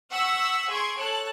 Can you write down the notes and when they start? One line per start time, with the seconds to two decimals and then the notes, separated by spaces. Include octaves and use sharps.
0.11 F#5 C#6 E6 B6
0.69 G#4 C6 C#6 G#6 D7
0.98 A4 C#5 A5 F#6